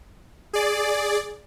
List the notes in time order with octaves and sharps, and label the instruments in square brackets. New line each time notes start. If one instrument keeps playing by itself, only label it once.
[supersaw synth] G#4 D5